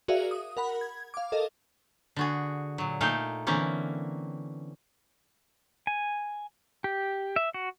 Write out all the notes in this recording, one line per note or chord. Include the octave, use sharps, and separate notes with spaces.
F#4 G#4 A#4 D5 E5 F5
D#6
A#4 F#5 B5
G#6
F5 D6
A4 A#4 D#5 F5
D3 F#4 G#4
A#2 F#3
A#2 A3 D#4 F5 G5
D3 E3 A#3 C4 C#4
G#5
G4
E5
F#4